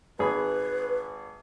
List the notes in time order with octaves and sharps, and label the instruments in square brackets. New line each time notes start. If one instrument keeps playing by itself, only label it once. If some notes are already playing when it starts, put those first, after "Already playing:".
[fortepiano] G#1 G#4 B5 [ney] B4